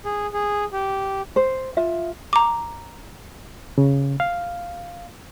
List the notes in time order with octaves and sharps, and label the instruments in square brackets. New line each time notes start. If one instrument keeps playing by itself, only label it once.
[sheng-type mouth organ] G#4
G#4
G4
[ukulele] C5
F4 E5
[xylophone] A#5 D6
[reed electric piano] C#3
F5